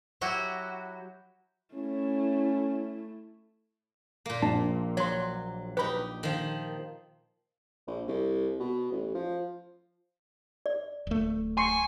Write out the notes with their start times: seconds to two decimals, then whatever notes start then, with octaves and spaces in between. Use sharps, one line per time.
0.21 F#3 E4 F#4 G4
1.74 A3 C#4 E4
4.26 A#2 A#3
4.42 A#1 A5
4.97 F#3 C#5 C6
5.77 D#4 G4 B4 B5
6.23 D#3 F3
7.87 A#1
8.08 C2
8.60 B2
8.91 A1
9.15 F3
10.66 D5
11.07 D1 A3
11.57 G#5 C6 C#6